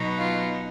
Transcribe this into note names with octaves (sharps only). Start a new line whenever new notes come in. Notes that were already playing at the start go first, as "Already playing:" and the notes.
Already playing: B2 F#3 B3 D#4
F4